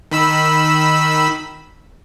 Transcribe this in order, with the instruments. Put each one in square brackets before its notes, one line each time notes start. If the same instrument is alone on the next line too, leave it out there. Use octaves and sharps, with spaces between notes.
[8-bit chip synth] D#3 B5 E6